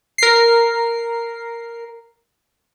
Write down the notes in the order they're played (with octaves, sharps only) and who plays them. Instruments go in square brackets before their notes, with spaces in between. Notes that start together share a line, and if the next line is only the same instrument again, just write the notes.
[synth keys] A#4 C7